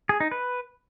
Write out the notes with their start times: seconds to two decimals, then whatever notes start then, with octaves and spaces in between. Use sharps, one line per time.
0.09 G#4
0.20 D#4
0.31 B4